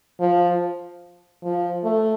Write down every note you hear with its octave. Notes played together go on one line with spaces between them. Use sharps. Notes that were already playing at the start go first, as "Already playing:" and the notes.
F3
F3
A3